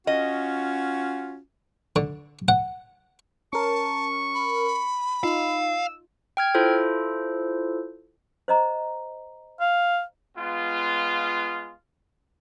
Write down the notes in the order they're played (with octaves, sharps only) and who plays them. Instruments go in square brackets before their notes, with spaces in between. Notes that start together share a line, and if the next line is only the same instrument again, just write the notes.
[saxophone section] C#4 F4 F#4 [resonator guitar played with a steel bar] D#5
[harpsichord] D3
F#5
[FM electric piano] C#4 A#4 [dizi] A5 [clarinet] C#6
[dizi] B5
[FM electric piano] D#4 F4 [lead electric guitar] F5 [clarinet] E6
[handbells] G5 F6 G#6
E4 F4 A4 C5
[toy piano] C5 D#5 A#5
[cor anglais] F5
[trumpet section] G#3 B3 F4